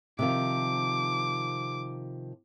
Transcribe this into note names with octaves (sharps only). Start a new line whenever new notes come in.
C3 D#3 F3 D6